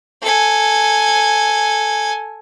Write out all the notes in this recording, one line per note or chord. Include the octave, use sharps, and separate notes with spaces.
A4 G#5